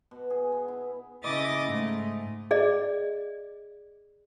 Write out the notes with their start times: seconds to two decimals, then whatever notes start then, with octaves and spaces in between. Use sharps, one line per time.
0.11 B2
0.30 G#4
0.52 B3
0.68 E4
1.22 C#3 E4 D#5 D6 D#6 A6
1.64 G#2 A3
2.51 G#4 D5 D#5